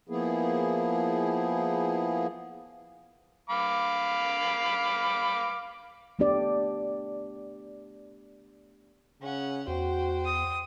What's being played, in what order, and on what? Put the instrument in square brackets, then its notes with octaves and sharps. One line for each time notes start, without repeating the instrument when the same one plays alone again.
[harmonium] F3 A#3 B3 E4 G#4
[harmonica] F5 B5 D6
[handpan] A3 B3 D4 G4 D5
[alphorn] C#3 [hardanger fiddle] C#4 F#5
[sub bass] E2 [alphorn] F#4 [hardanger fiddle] C5 G5
[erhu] D#6